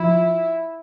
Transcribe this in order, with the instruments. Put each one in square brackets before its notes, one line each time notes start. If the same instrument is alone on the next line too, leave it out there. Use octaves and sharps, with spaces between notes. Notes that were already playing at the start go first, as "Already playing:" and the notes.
Already playing: [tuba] F3 [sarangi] E4